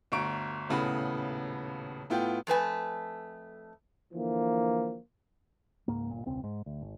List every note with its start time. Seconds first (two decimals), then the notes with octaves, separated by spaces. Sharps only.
0.12 G1 D2 A#5 C#6 D7
0.69 D#1 A2 C#3 B3 B5
2.10 A2 B3 F4 G5
2.47 F2 A3 B4 G#5
4.13 D3 E3 F3 A#3
5.88 C#2 G#2 A#3
6.11 G1 A#2
6.26 E1 C#2 C4
6.44 G#2
6.66 D2
6.82 G#1